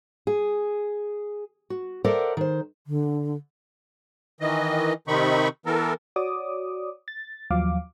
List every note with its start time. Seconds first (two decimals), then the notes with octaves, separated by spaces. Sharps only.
0.27 G#4
1.70 F#4
2.04 A4 A#4 C5 D5 E5 F#5
2.37 D#3 C5
2.87 D3
4.41 D#3 E3 D#5
5.08 C3 D#3 C4 D#4 B5 C#6
5.66 E3 B3 A4 A#4
6.16 F#4 C#5 D5 D6 D#6
7.08 A6
7.50 D#2 F3 F#3 F5 D6